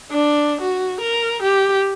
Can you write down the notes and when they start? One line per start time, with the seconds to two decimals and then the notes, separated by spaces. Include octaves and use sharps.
0.11 D4
0.61 F#4
1.01 A#4
1.42 G4